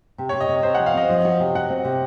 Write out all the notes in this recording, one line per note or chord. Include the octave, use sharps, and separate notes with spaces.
C3
C3 C#5
D#5
C3
C3 C5
F3 F#5
F5
C4 D#5
F3
F#4
C3
F#4 F#5
C4
C3